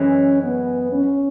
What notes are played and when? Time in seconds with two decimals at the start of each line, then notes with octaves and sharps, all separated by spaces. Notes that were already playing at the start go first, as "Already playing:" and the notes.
Already playing: F#2 E3 G#3 C#4
0.43 B3
0.92 C#4